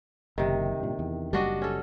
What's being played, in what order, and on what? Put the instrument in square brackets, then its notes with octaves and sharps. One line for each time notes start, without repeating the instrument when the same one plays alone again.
[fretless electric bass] F#1 [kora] C3 D#3
[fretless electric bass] G2 A#2
E2
[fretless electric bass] F#1 G3 [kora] D4 F#4 D#5
[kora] C#4 A4